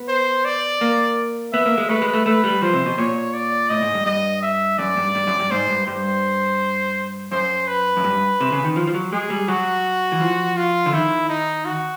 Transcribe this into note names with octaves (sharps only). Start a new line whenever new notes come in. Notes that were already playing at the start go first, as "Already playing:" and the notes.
Already playing: B3
C5
D5
A#3
B3 E5
A#3
G#3
A3 B4
G#3
A3
A3 B4
G3
F3 C5
C3
B2
A#2 C#5
D5
A2 D#5
G#2
G2
G2 D#5
E5
F#2 D5
G2
G2
F#2
G2
G#2 C5
G2
G2 C5
F#2 C5
B4
F#2
G2
C3
C#3
D#3
F3
F3
F#3
G#3 G#4
G3
F#3 F#4
E3
F3
F4
D3
D#3 E4
D#4
F#4